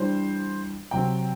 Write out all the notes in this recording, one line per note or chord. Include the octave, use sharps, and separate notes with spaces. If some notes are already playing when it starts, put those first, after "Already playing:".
Already playing: E3 G3 D4 C5
C3 F#3 C4 G5